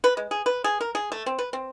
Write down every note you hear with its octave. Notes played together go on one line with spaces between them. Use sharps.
B4
G#3
G#4
B4
G#4
A#4
G#4
A3
C4
B4
C4